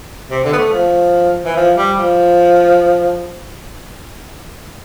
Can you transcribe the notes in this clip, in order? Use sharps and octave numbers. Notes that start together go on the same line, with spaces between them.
C3
D3
B3
A3
F3
E3
F3
G3
F3